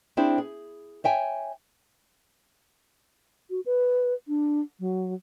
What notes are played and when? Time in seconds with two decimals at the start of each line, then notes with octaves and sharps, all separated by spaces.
0.17 C4 D4 E4 G#4 C5
0.38 G#4
1.04 C#5 E5 G5 G#5
3.50 F#4
3.66 B4
4.28 D4
4.80 F#3